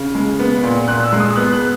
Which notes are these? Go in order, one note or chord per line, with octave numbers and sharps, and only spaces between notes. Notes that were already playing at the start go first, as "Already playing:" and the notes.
Already playing: C#3
G#3
B3
A#2
A#2 F#6
E6
G#3
D#6
B3 F#6
F#6